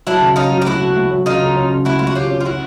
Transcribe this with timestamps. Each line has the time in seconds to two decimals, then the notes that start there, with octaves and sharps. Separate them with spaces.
0.07 F#3 D4 E4
0.22 C#3
0.36 C#4 D#4 F4
0.51 F#3
0.62 G4
0.66 A3 E4 F#4
0.81 A3
0.96 A3
1.11 F#3
1.26 C#3 D#4 F4
1.41 C#3
1.56 C#4
1.71 C#3
1.85 A3 E4 F#4
1.99 A3 F4
2.07 F#4
2.15 C#4 F4 G4
2.30 C#4
2.41 F4
2.45 C#4 E4 F#4